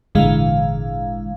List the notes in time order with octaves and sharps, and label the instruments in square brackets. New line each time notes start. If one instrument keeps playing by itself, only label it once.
[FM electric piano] G#1 A#2 D3 E3 G#3 F5